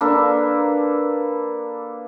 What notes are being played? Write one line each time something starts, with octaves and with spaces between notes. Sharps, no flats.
A#3 D4 A4 B4